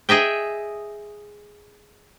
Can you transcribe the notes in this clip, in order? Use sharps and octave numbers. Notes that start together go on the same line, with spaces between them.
G#4 D#5 E5 G5